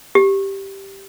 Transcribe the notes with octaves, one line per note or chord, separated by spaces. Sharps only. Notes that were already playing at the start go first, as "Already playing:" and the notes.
G4